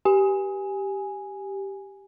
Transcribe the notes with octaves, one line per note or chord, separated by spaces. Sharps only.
G4 G#5